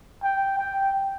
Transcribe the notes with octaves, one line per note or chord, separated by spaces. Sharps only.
G5
G5